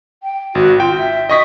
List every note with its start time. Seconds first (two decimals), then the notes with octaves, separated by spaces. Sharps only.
0.23 G5
0.55 G#1 F#4
0.80 F4 G5
0.97 E5
1.30 D#5 C#6 D#6 B6